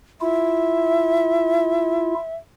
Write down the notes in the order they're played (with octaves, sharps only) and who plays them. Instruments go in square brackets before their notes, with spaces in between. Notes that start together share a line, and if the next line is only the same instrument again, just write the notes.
[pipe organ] E4 F4 [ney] E5